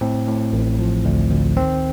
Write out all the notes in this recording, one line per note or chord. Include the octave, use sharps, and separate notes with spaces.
A2 C4
A2
A1
F3
D2
D2
D#3 C4